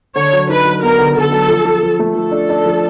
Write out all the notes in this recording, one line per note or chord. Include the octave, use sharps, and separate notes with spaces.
D3 C#5
F#3
D#4 B4
F#3
B3 A#4
D3
D3 A4
F#3
F3
F3
F3
A3
F3 A4
D4
D4
F3